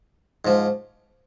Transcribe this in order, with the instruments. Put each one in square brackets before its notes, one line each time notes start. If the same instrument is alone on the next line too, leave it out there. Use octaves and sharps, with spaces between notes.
[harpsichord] G#2 F3